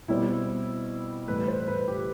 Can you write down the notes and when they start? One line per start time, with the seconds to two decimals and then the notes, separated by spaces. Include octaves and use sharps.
0.08 B2 G3 C4 E4
1.27 A2 E3 G3 B4
1.48 C5
1.68 B4
1.88 G4